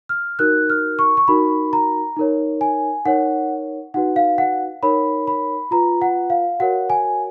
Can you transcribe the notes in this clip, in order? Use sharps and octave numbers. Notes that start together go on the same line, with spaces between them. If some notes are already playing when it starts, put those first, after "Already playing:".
F6
D#4 F#4 A#4 F#6
F6
C#6
C#6
D#4 F#4 A#4 B5
A#5
D#4 A#4 C#5
G#5
D#4 A#4 C#5 F#5
D#4 F#4 B4 F#5
F5
F#5
D#4 A#4 C#5 B5
B5
F4 B4 A#5
F#5
F5
F#4 A#4 C#5 F#5
G#5